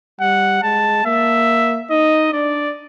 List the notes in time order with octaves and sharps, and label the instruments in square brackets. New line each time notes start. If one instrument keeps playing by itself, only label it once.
[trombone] G3 [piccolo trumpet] F#5
[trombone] G#3 [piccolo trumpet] A5
[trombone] A#3 [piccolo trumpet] E5
[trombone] D#4 [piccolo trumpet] D#5
[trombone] D4 [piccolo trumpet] D5